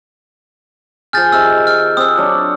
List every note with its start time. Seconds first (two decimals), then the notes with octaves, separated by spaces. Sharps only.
1.13 F3 G#4 F6 G6 A6
1.32 C3 D#3 E6 F6
1.67 F6
1.97 C4 D#6 E6
2.17 F#3 D4 D5